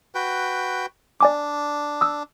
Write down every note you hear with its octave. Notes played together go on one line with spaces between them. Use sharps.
F#4 B4 G5
D4 D5 G#5 D6
D#6 E6